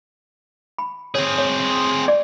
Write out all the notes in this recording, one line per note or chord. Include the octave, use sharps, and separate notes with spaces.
B5
C4 G#4 C#5
C#5
D5